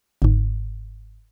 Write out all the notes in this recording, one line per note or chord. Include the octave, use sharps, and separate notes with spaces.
G1 G#2